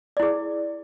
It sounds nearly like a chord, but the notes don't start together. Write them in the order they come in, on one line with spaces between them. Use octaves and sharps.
D5 E4 G#4